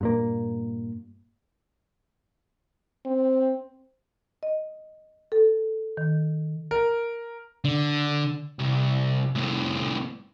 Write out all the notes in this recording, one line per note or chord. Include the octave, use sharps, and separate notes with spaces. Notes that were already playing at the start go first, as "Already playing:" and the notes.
G2 A#2 A#3
C4
D#5
A4
D#3
A#4
D3
C2
C2 A2